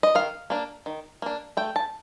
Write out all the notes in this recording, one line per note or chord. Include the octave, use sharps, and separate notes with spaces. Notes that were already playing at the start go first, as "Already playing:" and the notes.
D#5
D#3 F5
A#3 D4
D#3
A#3 D4
A3 G5
A5